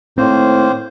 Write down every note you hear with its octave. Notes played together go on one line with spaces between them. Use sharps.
A2 D#3 A#3 C4 C5